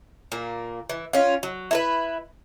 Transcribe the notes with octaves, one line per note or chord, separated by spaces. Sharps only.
A#2 A#3
E3
C#4 F4
F#3
E4 A#4 B4